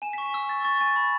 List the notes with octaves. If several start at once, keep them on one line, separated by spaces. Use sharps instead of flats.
G#5 E7
B6
C#6
B6
E6
C#6 A6
C#6 A6
G#5 A6
B5